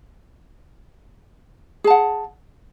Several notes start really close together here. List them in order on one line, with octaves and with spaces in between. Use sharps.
G#4 A5 F#5